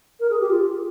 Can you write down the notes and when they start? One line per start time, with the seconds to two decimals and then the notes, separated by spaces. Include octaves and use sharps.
0.20 A#4
0.30 G#4
0.40 G4
0.50 F4